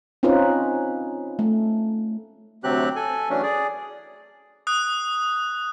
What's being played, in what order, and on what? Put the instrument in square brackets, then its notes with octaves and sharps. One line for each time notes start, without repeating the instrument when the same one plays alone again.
[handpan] C4 C#4 D#4 F4 B4 C5
A3
[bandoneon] D2 C3 F#3 C4 G4 F#6
A4 G#5
E3 F#3 A3 C#4 D4
G#4 D5
[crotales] D#6 F#6